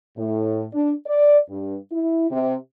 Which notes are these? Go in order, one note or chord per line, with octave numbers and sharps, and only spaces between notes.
A2
D4
D5
G2
E4
C3